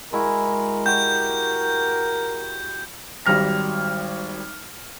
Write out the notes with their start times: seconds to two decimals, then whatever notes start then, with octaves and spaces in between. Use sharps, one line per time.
0.13 G#3 E4 F#4 A#4
0.86 F#4 G4 G6
3.26 G#1 F#3 G3 F6 A#6